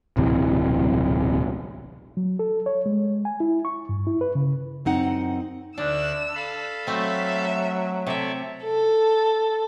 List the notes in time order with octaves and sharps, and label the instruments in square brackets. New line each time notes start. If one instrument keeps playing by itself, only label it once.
[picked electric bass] D1 B1 C3 E3
[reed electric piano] F#3
A4
C#5
G#3
G#5
E4
C#6
G2
E4
B4
C#3
[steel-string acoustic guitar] F#2 C4 D#4 F#5
[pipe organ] D2 D3 F#6 [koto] D4 [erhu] E6
[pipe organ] A4 F5 B5
[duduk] F#3 [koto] A3 C4 [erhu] E5
[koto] C3 E5 [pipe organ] A4 C#5 D5
[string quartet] A4